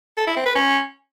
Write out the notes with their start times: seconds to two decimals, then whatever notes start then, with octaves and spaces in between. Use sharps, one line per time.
0.17 A4
0.27 E4
0.36 C4
0.46 B4
0.55 C#4